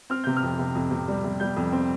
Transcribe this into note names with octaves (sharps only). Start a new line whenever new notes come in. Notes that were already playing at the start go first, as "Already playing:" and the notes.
C4 F6
C3 G6
F6
F2
C3
F2
C3
G3
C3
G3 G6
F2
C4